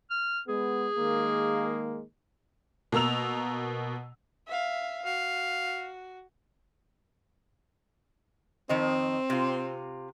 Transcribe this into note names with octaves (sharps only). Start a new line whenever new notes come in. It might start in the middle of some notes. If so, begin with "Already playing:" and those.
F6
G#3 B3 G#4
D#3 G#3 A#3
B2 A#3 A#5 E6 F7
E5 F5
F#4 F5
F2 D#3 C4 D#5
C3 F4